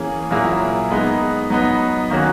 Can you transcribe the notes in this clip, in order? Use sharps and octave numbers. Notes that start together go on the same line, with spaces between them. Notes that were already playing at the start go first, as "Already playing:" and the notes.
Already playing: E3 A#3 C#4 G#4
A#2 F#3 A#3 E4 G#4
G#3 B3 D#4
F#3 B3 D#4
D#3 A#3 C#4 F#4